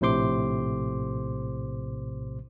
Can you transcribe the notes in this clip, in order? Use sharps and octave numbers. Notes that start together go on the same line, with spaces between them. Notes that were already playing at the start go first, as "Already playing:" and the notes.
A#1 A2 C3 C5 C6 D6